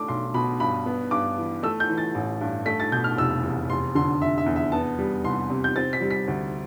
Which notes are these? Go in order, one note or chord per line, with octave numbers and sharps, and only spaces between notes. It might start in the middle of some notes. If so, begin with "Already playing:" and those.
Already playing: A3 D4 D6
B1 C6
B2 B5
G2 B5
B3
G2 D6
E3
A3 E6
G6
E3
A6
A1
G2
A3 B6
A6
B2 G6
F6
F1 E6
E2
F1 C6
D3 C6
F1 E5
E5
E2
E5
B3 A5
G3
C2 C6
C3
G6
C4 A6
B6
G3
B6
D2